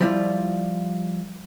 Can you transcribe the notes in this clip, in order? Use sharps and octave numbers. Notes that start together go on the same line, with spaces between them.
F3 G3 E4 F4 D5